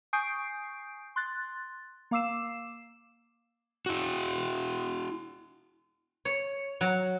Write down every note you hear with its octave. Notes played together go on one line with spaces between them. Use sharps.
G#5 C#6 D#6 G6 C7 D7
C6 F#6 A6
A#3 F5 D6 E6 C7 E7
E4 F#4
C#5
F#3